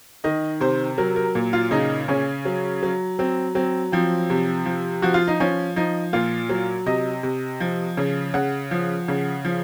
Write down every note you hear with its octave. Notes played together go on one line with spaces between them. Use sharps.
D#3 D#5
C3 C5
F#3 A#4
A#4
A#2
F4
C#3 D#4
C#3 C#4
F#3
F#3
F#3 C4
F#3 C4
F3 C4
C3
F3
F3 F#4
F4
D#4
F3 C#4
F3 D#4
A#2 F4
F#3
C3 D#5
C3
F3
C#3
C#3 F#5
F3
C#3
F3